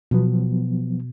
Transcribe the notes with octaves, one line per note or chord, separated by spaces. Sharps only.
B2 F3 F#3 B3